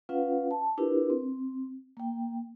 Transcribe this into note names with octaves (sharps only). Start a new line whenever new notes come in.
C#4 F4 B4 F5 F#5
A5
D4 E4 F4 G4 A#4 B4
C4
A#3 G5